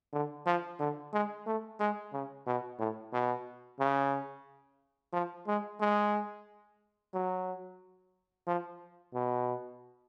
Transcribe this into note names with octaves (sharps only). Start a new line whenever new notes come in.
D3
F3
D3
G#3
A3
G#3
C#3
B2
A2
B2
C#3
F3
G#3
G#3
F#3
F3
B2